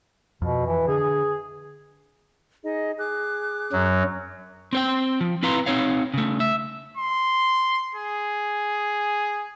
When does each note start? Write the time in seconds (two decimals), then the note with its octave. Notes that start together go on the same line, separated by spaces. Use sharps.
0.42 F2 B2
0.66 E3
0.88 D3 G#4
2.63 D#4 G#4 D#5
2.97 G#4 D6 F#6
3.73 F#2 F#3
4.73 C4 C5 G5
5.21 F3
5.43 C4 E4 B4 F5 A#5 C6
5.66 C4 D#4 C#5 F5
6.14 C#3 A3
6.40 E5
6.97 C6
7.95 G#4